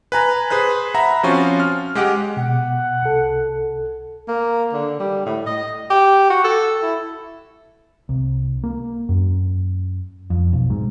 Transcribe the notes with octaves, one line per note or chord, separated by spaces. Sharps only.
B4 G#5 A#5
G#4 B4 C5 F#6
E5 F#5 A#5 B5
F3 C4 C#4 F4 F#4
F6
G#3 G4 D#5 F#5 D6
B2 F#5
C2 A4
A#3
D3
G3
A2
D#5
G4
F#4
A4
E4
C2
A#3
F#2
F2
B1
G#2